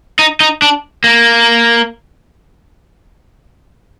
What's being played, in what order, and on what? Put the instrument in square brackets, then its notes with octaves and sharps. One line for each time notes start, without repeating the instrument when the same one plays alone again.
[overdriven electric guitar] D#4
D#4
D4
A#3